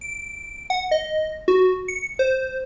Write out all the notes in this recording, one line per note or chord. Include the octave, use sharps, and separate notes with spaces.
D7
F#5
D#5
F#4
C#7
C5